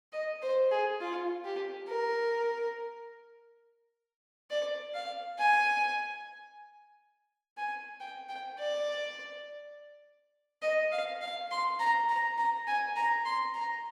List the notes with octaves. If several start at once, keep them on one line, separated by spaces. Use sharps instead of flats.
D#5
C5
G#4
F4
G4
A#4
D5
F5
G#5
G#5
G5
G5
D5
D#5
F5
F5
C6
A#5
A#5
A#5
G#5
A#5
C6
A#5